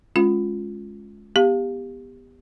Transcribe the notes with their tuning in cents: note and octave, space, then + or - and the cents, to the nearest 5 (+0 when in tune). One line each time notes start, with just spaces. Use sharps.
G#3 +15 C#4 -5 F4 +5
B3 +0 G4 +15 F5 +0